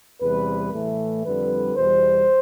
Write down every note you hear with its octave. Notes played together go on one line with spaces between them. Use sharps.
E2 C3 G3 B4
A2 E3 A3
F2 D3 G3 B4
E2 B2 G3 C5